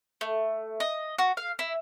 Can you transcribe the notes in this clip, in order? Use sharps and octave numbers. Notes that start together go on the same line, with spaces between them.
A3
D#5
F#4
F5
E4